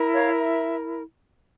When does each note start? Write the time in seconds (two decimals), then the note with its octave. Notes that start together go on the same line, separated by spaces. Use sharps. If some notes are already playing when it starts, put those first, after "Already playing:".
Already playing: E4 A#4
0.12 C#5 F5
0.39 E5